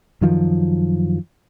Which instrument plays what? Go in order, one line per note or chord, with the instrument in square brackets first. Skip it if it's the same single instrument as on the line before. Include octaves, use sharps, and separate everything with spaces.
[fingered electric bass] F#2 D#3 F3 F#3